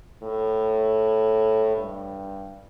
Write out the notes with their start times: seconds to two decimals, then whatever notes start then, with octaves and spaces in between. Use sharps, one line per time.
0.23 A2
1.77 G2